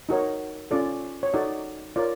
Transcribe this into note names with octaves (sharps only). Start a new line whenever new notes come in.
D#4 F#4 A#4 C#5
C#4 F4 A4 D5
C#5
D#4 F#4 A4 D5
F4 A#4 C#5 D5